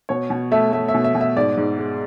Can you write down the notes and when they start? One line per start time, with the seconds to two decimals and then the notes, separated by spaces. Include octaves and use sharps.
0.09 B2 C#5
0.30 B2
0.51 A3 E5
0.72 A3 E5
0.88 E5
0.94 B2
1.04 E5
1.15 B2
1.21 E5
1.36 G#2 D5
1.57 G#2
1.79 G#3